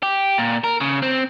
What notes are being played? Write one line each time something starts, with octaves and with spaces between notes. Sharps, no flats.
G4
A#2
A#4
C#3
C4